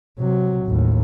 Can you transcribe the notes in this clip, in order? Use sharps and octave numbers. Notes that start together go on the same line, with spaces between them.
C3 F#3
A1 D#2